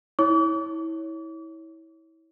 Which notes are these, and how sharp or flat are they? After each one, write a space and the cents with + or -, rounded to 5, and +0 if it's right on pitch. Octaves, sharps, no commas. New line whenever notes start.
E4 -25 C#5 +0 D6 -40